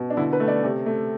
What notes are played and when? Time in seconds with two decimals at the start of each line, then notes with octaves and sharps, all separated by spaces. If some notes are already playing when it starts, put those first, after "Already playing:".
Already playing: B2
0.10 D4
0.17 D3 E4
0.33 B4
0.40 A3
0.48 D5
0.64 C3
0.86 A3